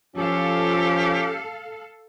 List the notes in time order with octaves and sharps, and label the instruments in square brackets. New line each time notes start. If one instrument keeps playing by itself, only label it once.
[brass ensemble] F3 F4 [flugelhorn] C#4 [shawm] G4 [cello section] A4 F5